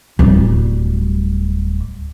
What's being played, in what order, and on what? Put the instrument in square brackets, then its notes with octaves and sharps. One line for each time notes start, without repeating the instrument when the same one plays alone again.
[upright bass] D1 G3